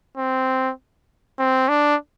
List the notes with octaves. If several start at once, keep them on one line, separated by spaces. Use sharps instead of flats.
C4
C4
D4